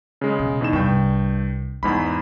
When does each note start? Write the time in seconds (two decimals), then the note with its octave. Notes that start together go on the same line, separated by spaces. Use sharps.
0.21 C#3 G#3
0.39 B2
0.61 E2 D#4 E7
0.73 C2 G2 G5
1.83 E2 G#2 G#3 B5